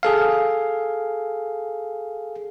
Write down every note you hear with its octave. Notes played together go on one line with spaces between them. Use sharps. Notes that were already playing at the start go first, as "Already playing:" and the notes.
G#4 A4 F5